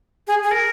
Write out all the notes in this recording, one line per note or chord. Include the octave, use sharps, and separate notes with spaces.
G#4
G#4
A#4